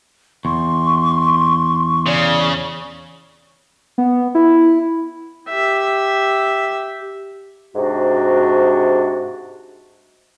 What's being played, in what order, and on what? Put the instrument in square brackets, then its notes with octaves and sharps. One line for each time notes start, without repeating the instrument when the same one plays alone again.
[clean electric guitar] E2 [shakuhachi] C6 [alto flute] C#6
[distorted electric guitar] C#3 [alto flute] D5
[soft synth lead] B3
E4
[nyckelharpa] G4 E5
[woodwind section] G#2 C3 D4 F#4